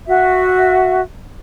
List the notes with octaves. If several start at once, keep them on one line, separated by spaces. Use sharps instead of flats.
F#4 E5